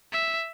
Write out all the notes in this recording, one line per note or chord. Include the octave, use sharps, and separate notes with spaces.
E5